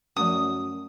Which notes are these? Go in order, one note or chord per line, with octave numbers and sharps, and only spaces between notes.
F#2 F3 A3 C#4 D#6